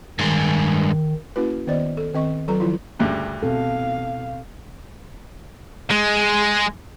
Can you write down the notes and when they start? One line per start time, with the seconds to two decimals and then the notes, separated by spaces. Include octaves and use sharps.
0.19 G2 D#3 G#3
1.36 A#3 C#4 E4 F#4 B4
1.67 D#3 B3 C5 D5 D#5
1.97 A4
2.14 D#3 C4 D#5 C#6
2.48 F#3 F4 A4 B4 A#5
2.60 D#3 F3 F#3 E4 F4
2.99 D2 G2 C#3
3.43 B2 C4 A4 F5
5.91 G#3